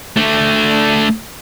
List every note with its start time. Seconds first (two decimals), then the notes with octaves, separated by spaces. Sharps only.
0.17 A3 D4